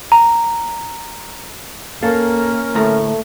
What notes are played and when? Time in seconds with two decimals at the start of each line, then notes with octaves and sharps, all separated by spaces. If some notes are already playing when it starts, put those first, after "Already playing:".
0.12 A#5
2.03 A#3 C#4 A4 A#4 F5
2.75 D2 A2 A3 A#5